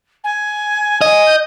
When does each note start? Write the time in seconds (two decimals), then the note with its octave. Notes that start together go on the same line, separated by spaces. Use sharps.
0.24 G#5
1.01 D#5 G#5
1.26 G6